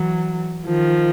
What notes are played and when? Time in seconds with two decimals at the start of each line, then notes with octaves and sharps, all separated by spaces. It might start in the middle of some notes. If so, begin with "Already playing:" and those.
Already playing: E3 F#3
0.66 D#3 F3